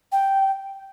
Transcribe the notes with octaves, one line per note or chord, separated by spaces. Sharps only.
G5